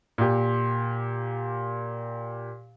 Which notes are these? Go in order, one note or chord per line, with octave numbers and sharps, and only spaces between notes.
A#2 G4